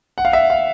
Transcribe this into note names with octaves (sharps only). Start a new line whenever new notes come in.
F#5
F5
E5
F5